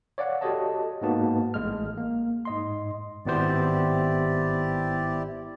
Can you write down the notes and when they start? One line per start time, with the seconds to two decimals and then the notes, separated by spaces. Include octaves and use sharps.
0.18 C#5 D5 F5 F#5
0.41 F#4 G4 A4 C#5 D#5 A5
1.01 G#2 G#3 A#3 B3 F#4 A5
1.54 A1 A2 G#3 F6
1.98 A#3
2.45 G#2 D#5 C6
3.26 G#1 B3 E4 G4 C5 D5